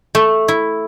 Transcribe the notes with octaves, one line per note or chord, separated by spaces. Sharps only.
A3
E4